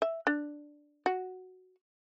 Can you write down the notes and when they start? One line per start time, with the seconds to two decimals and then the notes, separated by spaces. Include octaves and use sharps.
0.02 E5
0.27 D4
1.06 F#4